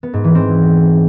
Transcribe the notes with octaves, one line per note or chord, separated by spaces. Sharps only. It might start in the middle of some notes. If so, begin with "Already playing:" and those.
B3
G#2
E3
C4